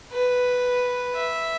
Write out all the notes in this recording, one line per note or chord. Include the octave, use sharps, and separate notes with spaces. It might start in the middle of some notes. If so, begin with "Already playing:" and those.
B4
E5